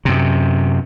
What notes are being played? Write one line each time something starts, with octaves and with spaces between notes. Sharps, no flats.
F#2 C3